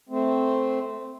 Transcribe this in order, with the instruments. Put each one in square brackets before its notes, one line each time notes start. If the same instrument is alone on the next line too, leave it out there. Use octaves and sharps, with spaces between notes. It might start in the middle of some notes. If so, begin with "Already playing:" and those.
[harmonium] A3 C4